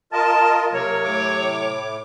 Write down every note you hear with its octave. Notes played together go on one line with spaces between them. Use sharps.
F4 A#4 D#5 A5
C3 F#3 A#3 A#4 C#5
A2 D6